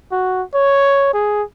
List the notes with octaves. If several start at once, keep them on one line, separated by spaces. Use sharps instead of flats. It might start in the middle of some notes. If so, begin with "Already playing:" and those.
F#4
C#5
G#4